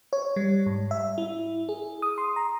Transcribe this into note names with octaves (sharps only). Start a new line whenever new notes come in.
C#5
G3
G#2
E5
E4
G#4
D#6
C6
A#5